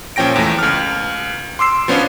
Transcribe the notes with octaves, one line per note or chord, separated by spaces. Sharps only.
A#2 F3 C#4 G5 A#6 D7
E2 A3
C#2 F6
C6 D6 E6 C7
F3 B3 C#4 D4 F4 C#5